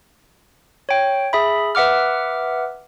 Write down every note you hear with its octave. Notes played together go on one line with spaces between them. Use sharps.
C#5 G5
G#4 E5 B5
B4 E5 F#5 D6 F6